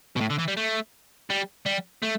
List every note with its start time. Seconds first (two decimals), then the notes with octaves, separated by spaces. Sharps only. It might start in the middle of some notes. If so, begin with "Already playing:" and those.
0.16 B2
0.21 A2
0.30 D3
0.39 E3
0.48 G3
0.57 A3
1.30 G3
1.66 G3
2.02 A3